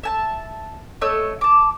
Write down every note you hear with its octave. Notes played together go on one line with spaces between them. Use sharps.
E5 G#5 A5
A3 C#5 D#5 E6
A5 D6